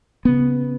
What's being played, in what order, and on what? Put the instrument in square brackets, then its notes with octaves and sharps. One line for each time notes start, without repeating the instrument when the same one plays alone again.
[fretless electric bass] C#3 B3